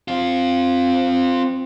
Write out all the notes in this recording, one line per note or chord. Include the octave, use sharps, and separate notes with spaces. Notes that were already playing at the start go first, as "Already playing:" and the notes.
C4 F4